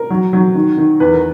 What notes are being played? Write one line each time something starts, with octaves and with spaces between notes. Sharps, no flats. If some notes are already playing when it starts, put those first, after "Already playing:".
Already playing: A#4
F#3
F#3
D#3
D#3
E2 B4
A#4